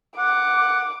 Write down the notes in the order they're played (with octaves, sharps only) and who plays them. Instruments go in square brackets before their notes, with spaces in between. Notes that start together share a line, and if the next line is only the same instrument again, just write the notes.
[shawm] F#5 [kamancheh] D6